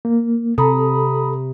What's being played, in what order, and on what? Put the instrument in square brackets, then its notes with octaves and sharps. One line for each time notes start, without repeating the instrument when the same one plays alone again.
[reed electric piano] A#3
[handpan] C3 [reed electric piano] A4 [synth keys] A#5 B5 D#6